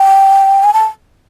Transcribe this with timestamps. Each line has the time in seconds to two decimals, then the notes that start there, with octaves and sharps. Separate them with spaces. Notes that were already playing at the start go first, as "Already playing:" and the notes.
Already playing: G5
0.64 G#5
0.73 A5